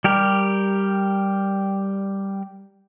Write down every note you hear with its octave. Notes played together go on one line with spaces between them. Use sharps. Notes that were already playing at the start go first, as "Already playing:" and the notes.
G3 G4 A#4